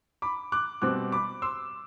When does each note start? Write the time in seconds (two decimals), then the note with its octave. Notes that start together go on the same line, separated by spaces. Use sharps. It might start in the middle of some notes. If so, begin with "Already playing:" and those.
0.22 B5 D6
0.52 D6 F#6
0.82 B2 G3 C4 D6 F#6
1.12 B5 D6
1.42 C6 E6